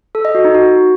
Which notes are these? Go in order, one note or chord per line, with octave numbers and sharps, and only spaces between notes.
A4
D#5
F#4
D#4
F#4